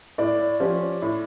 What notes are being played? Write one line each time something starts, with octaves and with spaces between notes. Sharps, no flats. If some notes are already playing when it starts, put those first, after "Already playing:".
A2 D5
F3 C#4 G4
A2